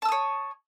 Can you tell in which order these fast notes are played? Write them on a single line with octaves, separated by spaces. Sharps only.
A5 E6 D#6 C#5